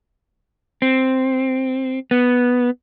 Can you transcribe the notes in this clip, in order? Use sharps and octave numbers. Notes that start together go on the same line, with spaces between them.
C4
B3